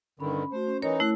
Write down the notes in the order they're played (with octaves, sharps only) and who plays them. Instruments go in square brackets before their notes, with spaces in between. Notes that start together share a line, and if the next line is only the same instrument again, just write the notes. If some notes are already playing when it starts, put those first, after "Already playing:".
[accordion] G2 D3 D#3 [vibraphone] C#4 B5
[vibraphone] A3 F#4 [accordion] C5
[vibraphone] C#4
[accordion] E3 D#4 [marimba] A#4 C#5
[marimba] A3 E4 [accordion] F#6